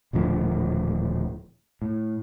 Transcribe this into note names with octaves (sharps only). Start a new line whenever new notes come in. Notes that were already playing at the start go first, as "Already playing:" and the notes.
D#1 A2 D3 F3
A2